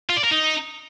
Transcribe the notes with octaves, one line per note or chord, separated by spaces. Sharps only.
F4
D5
A#4
D#4